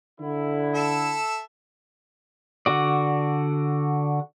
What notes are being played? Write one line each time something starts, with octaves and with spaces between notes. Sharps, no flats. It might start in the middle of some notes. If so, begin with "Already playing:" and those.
D3 E4
A4 E5
D3 F#4 D5